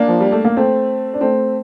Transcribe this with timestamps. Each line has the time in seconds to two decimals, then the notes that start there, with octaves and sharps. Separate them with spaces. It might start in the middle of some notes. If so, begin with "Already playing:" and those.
Already playing: A#3 D4
0.08 F3
0.20 G3
0.32 A3
0.45 A#3
0.57 A3 C4
1.14 D4
1.21 A3 C4